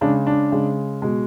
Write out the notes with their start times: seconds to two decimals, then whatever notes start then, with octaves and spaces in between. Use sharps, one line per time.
0.01 C#3 G#3 D4
0.27 D4
0.52 C#3 G#3
1.02 B2 G#3